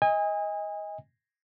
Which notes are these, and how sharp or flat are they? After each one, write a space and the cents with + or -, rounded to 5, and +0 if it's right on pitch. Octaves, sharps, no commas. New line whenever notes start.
D#5 +20 G#5 -30